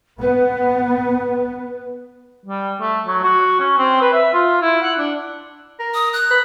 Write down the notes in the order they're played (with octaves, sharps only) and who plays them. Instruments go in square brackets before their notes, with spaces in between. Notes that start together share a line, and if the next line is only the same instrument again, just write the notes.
[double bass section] B3 [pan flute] B4
[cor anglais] G3
A3
F#3
F#4
C#4
C4
B4
E5
F4
E4
F#5
D4
[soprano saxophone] A#4
[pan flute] D#6
F#6
[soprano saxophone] B4